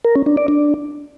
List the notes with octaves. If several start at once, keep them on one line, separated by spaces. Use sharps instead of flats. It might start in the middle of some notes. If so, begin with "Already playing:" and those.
A#4
C#4
D4
D5
D4